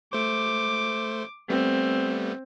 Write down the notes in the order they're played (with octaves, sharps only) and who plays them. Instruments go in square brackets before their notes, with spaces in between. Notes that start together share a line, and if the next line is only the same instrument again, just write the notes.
[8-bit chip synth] A3 C5 [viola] D6
[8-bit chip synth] G3 A3 B3 [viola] C4